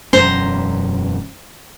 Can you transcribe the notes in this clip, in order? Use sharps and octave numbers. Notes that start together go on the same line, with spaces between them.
E1 F#2 C#4 C5 A#5